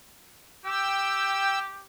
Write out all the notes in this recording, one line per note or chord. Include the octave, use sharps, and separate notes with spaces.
G4 G5 E6